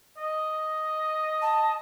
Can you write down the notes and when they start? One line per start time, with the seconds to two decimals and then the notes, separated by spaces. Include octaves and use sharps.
0.18 D#5
1.42 A5